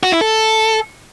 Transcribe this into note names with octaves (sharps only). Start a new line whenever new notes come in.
F#4
E4
A4